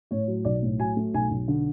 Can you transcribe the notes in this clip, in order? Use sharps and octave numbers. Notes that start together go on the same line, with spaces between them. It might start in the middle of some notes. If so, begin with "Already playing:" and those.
A2 C#5
F#3
B1 D5
A2
F#3 G#5
A3
B1 G#5
B1
D3